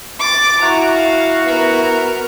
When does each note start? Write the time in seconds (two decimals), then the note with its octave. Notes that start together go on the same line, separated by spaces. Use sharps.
0.19 D6 A6
0.61 E4 F#4 A#5
0.95 F5
1.44 B3 A#4